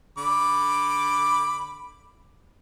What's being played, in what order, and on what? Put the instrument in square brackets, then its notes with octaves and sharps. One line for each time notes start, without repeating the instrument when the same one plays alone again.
[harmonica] D3 B5 D6